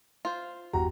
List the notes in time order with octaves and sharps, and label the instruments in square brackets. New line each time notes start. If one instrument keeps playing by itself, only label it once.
[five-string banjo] F4 C5
[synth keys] G1 E2 [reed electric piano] G2 F#4 G4 [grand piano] A#5